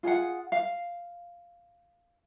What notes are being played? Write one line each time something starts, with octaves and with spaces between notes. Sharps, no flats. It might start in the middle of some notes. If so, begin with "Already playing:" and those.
F4 G#4 F5 F#5
F5